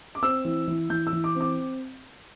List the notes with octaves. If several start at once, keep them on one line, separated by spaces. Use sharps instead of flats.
D6
C4 E6
E3
E3
E3 G6
E6
E3
D6
C4
D6